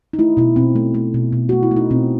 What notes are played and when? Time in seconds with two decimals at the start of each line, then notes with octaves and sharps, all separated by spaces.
0.13 D#4
0.19 A3 E4
0.37 B2 E4
0.56 B2 C4
0.76 A3
0.94 A3
1.14 B2
1.33 B2
1.49 A3 F#4
1.63 E4
1.71 A3
1.76 D#4
1.90 B2 C4